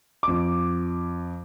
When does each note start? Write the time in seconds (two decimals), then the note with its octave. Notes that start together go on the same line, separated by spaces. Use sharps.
0.23 F2 D6